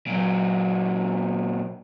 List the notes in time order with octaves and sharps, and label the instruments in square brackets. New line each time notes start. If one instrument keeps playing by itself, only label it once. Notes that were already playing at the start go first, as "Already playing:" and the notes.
[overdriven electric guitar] A#2 F#3